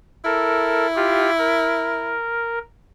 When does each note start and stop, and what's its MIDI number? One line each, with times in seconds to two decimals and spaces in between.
0.25 2.14 64
0.25 0.87 69
0.25 0.87 70
0.96 1.30 65
0.96 1.30 67
1.39 2.59 70